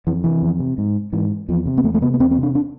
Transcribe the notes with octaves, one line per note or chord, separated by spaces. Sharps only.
F2 E3
C3 E3
F2
C3
G#2
G#2 E3
E2 F3
C3
B3
E2 A3
A3
C3 B3
B3
E2 C4
C4
C3
D4
D4